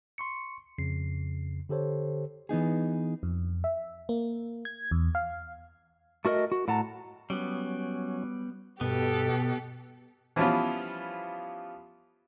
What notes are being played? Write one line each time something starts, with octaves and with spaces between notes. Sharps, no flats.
C6 C#6 C#7
F2 C#3 C7
D3 G4 A4 C5 C#5
E3 B3 D#4 G#4
F2
E5
A#3
G#6
E2
F5
A3 F#4 A#4 D5 D#5
F#4
A2 F#5 A5 A#5
F#3 G3 B3 C#4
G2 B2 B3 G4 A4
E3 F3 G3 B3 C#4 F4